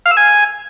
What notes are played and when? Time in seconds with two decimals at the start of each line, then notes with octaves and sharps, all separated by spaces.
0.06 F5
0.11 E6
0.17 G#5